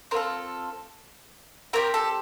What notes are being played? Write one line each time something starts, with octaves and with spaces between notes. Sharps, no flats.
C4 F4 A4 A#4
C4 D#4 G4 A#4
A4